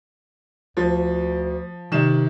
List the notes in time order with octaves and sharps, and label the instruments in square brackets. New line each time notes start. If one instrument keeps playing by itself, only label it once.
[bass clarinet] D2 [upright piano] F3
[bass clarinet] C3 [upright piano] D#3 E7